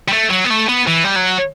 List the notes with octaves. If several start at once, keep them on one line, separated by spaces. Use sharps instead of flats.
G3
A3
F#3
B3
A3
B3
E3
G3
F#3